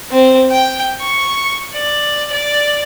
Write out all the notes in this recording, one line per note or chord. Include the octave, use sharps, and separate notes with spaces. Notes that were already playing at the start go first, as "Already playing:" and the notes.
C4
G5
C#6
D5
D5